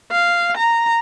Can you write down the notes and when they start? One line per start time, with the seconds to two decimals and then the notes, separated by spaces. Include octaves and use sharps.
0.11 F5
0.57 A#5